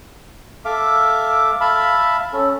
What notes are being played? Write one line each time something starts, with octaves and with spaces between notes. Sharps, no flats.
A4 E5 F5 D6
E5 F5 A5 B5
C#4 A4